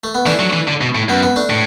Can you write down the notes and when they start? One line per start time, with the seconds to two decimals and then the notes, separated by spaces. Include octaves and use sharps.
0.04 A3
0.15 B3
0.26 E3 A3 D4
0.40 F#3
0.53 E3
0.68 D3
0.81 B2
0.95 A2
1.09 F#2 B3
1.23 B3
1.36 A3 D4
1.50 A2